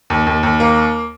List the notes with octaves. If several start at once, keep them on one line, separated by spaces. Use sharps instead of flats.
D#2
D#2
D#2
A#3